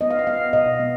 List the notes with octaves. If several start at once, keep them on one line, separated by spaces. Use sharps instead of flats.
B3 D#5
F5
D#5
B3 F5
B2 D#5
B3